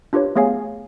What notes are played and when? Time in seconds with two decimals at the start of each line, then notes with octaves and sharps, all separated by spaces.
0.13 D4 F4 G4 B4 C#5
0.36 A3 B3 G#4 C#5 F5 G#5